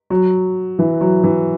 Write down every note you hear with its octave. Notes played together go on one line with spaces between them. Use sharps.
F#3
E3
F#3
E3